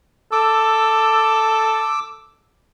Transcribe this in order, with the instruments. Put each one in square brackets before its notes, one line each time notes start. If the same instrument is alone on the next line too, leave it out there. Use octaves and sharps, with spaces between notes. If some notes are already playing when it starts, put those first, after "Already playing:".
[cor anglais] A4 [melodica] D6 E6